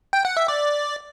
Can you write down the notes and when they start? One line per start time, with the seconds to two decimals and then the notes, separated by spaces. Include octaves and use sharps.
0.13 G5
0.25 F#5
0.37 E5
0.48 D5